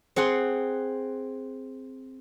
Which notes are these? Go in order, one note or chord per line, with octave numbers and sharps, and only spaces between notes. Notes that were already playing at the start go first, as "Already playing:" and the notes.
C4 G#4 F#5 C6